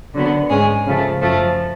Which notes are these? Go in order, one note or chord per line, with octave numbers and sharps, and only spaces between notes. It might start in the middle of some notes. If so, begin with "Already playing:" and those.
D3 F#3 B3
G#2 G#3 C#4 G#4
C#3 F3 A3
F#2 F3 A3